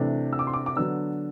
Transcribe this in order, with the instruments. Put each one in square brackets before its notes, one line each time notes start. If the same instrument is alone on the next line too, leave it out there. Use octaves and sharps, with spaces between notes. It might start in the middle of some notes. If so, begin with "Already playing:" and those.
Already playing: [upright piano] C3 E3 A3 D4
E6
D6
C6
D6
D6
D3 F#3 B3 D4 E6